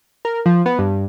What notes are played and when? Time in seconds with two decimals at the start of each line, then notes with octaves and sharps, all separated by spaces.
0.25 A#4
0.46 F3
0.66 B3
0.79 G2